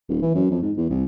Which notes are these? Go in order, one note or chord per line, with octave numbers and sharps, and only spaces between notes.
D#1
E3
F#2
F2
G#2
E2
C2